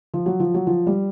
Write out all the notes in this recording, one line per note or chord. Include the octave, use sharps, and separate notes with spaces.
F3
F#3
F3
F#3
F3
G3